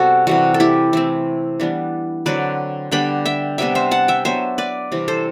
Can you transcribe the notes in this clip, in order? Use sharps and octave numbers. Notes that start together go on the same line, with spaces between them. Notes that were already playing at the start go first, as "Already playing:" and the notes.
Already playing: C3 G3 B3 F#4 A4
C3 E3 G3 F#4
A4
E4 G4
E3 A3 C4 E4
E3 G3 B3 D4
D3 F#3 C4 B4 D5
D3 G3 B3 D4 G5 B5
E5 G5
C3 G3 B3 D4 E5 G5
C5 E5
F#5 A5
E5 G5
F#3 B3 D4 C5 E5
B4 D5
C3 E3 G3 C4
A4 C5